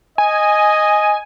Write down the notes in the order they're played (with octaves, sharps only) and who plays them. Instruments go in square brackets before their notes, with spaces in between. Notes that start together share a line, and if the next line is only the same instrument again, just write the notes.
[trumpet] D#5 [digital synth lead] G#5